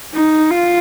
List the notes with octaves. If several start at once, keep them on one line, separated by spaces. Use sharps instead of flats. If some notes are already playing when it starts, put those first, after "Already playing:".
D#4
F4